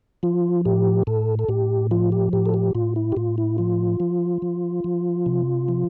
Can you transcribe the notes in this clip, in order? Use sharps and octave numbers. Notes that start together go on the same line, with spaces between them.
F3 F4
A2 G4
A2 A4
A4
A2 G4
F3 F4
G4
A2 G4
A4
G4
A2 F4
E4
G4
A2 F4
E4
F3 F4
F3
F3
F3
C3
F3